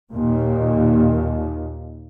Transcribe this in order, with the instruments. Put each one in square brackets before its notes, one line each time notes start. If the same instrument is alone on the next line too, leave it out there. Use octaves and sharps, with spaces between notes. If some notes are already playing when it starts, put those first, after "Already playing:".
[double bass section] D#2 A#2